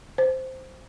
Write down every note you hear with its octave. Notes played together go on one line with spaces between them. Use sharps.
C5